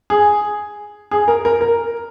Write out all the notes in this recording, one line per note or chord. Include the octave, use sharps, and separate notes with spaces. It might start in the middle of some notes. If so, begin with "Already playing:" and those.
G#4
G#4
A#4
A#4
A#4